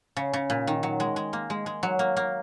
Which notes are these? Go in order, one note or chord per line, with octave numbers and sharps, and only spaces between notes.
C#3
C#3
A#2
D#3
F#3
G#3
G#3
A#3
G#3
G#3
F#3
A#3
A#3